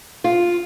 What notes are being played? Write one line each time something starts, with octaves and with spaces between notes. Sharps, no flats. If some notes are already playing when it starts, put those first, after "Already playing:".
F4